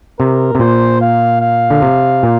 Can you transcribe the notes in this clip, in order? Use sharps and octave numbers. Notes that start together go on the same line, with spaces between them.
C3 A#4
C3
A#2 C5
F5
F5
D3
C3
A#2